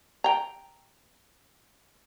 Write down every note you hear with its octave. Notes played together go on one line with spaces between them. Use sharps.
G5 A#5